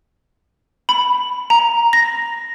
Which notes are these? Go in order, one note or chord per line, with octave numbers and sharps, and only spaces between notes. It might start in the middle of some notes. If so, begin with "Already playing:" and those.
B5
A#5
A#6